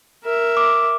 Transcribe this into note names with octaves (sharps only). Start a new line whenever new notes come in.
A#4 E5
D6